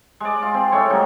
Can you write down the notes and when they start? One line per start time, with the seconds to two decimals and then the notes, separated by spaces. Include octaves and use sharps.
0.20 G#3 D5
0.42 F4
0.54 C4 C6
0.72 A2 G#3 A3 C#5
0.90 C#3 F#3 G3 D#4